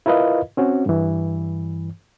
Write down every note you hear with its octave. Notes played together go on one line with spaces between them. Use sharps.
E4 F4 A#4 B4 D#5 F5
C4 C#4 F#4
G2 E3